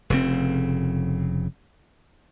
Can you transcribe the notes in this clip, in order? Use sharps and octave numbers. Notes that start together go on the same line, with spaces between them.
F1 C#3 C4